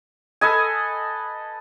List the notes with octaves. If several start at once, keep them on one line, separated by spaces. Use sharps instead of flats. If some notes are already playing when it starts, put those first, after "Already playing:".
A4 B4 D#5 G#5